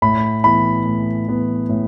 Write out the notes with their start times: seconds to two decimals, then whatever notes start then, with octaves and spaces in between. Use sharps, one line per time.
0.02 A2 B5
0.44 E3 B3 B5
0.86 A2
1.27 E3 B3
1.69 A2